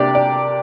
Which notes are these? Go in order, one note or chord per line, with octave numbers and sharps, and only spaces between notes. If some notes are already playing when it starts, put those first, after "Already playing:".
Already playing: C3 A#3 D4 G4 D5
D5